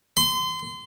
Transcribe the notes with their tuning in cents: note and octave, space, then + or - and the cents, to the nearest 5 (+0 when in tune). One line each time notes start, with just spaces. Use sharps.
C6 -30